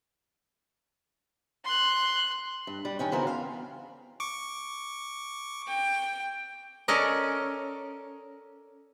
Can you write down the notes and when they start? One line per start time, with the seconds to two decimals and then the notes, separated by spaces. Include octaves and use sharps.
1.65 C6 F#6
2.67 G2
2.85 G3
2.99 G2 D#3 C#4 G5
3.12 C#3 E3 B3 F#4 A#4 C5
3.27 F5
4.20 C#6 D6
5.68 G5
6.88 C#4 A4 A#4 D5 D#5